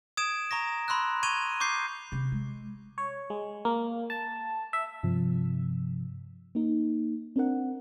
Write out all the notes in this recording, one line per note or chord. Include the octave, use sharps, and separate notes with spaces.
D#6 G#6 D7 E7
A#5 C#6 A#6
B5 C6 E6 F#6
C#6 G#6 D#7 F7 G7
C#6 D6 G6 C7
C3
G#3
C#5
G#3
A#3
A5
E5
G2 C3 F3
A#3 D#4
C4 D4 A#4 F#5